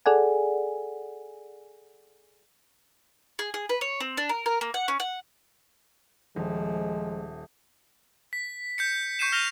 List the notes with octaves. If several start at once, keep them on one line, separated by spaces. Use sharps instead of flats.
G#4 A4 D5 F#5 G#5
G#4
G#4
B4
C#5
C4
D4
A#4
A#4
A#3
F#5
C#4
F#5
D#1 F3 G#3
B6
G6 B6 C#7
C#6 G6 C7 C#7 D#7 E7
F6 A#6 F7